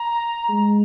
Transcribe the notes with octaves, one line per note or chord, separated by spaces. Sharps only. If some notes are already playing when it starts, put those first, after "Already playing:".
Already playing: A#5
G#3